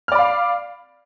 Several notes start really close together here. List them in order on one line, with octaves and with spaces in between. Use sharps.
F6 D5 B5 F5